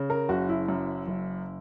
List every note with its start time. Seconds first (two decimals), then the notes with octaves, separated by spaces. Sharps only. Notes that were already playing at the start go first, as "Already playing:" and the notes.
Already playing: C#3
0.10 A#4
0.29 F#1 F#4
0.49 E4
0.69 F#2
1.07 F#1